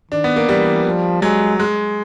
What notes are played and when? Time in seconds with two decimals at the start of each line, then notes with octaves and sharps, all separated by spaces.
0.11 D#3 D4
0.24 B3
0.36 A#3
0.48 E3 G3
0.85 F3
1.22 F#3 G#3
1.59 G#3